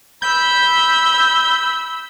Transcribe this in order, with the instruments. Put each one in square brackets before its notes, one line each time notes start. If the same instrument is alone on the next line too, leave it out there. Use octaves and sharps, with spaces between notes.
[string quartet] B5 E6 [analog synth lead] G6